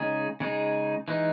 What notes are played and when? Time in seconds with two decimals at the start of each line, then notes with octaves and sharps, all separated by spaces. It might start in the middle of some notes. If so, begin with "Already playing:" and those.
Already playing: C#3 G#3 D#4 G#4
0.40 C#3 G#3 D#4 G#4
1.08 E3 G#3 D#4